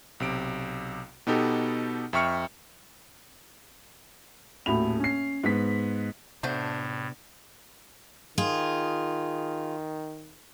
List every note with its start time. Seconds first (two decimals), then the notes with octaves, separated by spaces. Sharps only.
0.20 B1 C3 D7
1.27 B2 B3 D#4 G4 A4
2.13 F2 E5 G5 C#6 F6 C#7
4.66 D#1 A2 F#4 B5 F7
5.00 C#4 C7
5.44 G#2 B3 B6
6.43 A2 C3 A3 B3 D4 F#4 C5
8.38 D#3 F4 G#4